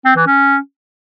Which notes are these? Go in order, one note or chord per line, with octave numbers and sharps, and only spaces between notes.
C4
E3
C#4